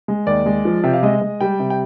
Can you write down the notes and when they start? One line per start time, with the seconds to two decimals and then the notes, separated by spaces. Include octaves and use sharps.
0.08 G#3
0.27 D#2 D5
0.46 G#3
0.65 F3
0.83 C3 G5
0.93 F5
1.03 G#3 D#5
1.21 G#3
1.41 G3 G5
1.59 C3
1.70 G5